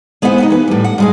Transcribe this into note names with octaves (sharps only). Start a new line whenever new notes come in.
G#3 B3 E4 C5 F5 F#5
B3 C4 D#4
E3 B4
A2 G3
F#5
G2 G#3 G#4